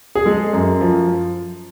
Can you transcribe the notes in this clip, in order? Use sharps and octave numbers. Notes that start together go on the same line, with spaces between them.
G#4
G#3 A4
F#2
F3